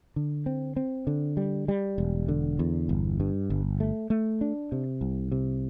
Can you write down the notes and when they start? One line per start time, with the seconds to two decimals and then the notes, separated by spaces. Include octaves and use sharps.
0.16 D3
0.46 C4
0.76 C4
1.07 D3
1.37 G3
1.68 G3
1.98 E1
2.28 D3
2.59 E2
2.89 G1
3.20 G2
3.50 G1
3.80 A3
4.10 A3
4.41 D4
4.72 C3
5.01 C2
5.32 C3